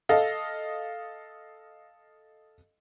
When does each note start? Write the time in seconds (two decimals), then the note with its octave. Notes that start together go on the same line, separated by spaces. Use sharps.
0.09 A4 D#5 F5